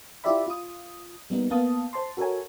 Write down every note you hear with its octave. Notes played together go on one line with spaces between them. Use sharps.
E4 F4 G4 D5 E5 B5
F4 D#6
G3 A#3 B3 D#4
A#3 B3 F5 A5 D#6
C5 A5 C6
F#4 A4 A#4 C#5 G#5